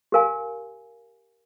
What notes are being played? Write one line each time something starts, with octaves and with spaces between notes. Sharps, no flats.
G4 A#4 F5 G#5